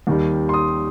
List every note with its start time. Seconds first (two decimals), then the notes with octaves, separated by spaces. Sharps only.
0.07 D#2 D#3 G3
0.49 C6
0.54 D#6